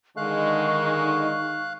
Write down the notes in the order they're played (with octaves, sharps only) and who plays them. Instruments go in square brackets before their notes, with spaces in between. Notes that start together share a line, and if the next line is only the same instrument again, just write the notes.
[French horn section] D3 G#3 [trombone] D#3 [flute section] D#4 C#6 [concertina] F5 F#6